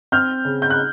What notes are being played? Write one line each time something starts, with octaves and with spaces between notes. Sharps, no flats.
C4 F6 G6
C#3
G6
F#6